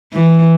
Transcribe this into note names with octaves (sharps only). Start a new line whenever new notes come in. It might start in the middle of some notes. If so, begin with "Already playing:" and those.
E3